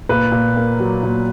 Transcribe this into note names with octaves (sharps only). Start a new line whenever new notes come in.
A#2 B4
A#2
A#3
F#3
A#2